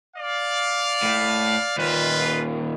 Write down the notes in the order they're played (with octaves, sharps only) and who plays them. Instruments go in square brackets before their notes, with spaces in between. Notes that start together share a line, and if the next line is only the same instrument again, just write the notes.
[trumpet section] D5 F5
[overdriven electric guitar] A2
[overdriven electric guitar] D#2 A#2 [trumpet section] F4 B4